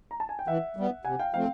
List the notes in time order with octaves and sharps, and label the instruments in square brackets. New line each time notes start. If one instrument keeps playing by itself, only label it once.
[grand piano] A#5
A5
G#5
G5
[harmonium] E3 [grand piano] E5 F#5
[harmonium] G3 B3
[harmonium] C3 [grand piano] F#5 G#5
[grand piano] F5 G5
[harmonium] F3 A3 C4 [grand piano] F5 G5